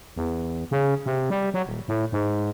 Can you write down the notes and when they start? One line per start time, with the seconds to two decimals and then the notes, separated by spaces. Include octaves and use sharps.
0.16 E2
0.71 C#3
1.06 C3
1.30 G3
1.54 F#3
1.66 D#1
1.88 A2
2.12 G#2